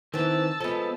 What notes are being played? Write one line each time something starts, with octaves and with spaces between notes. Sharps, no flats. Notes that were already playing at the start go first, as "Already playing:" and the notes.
D#3 E3 C4 A5 E6
F3 G#3 B3 A4